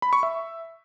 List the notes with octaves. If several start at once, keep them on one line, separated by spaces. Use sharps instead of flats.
B5
C#6
E5